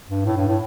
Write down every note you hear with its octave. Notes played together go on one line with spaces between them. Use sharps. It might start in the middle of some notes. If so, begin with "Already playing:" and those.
G2
A2
G2
A2